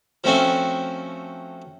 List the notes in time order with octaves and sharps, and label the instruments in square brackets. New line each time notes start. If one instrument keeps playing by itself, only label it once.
[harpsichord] F3 A3 C4 C#4 F#4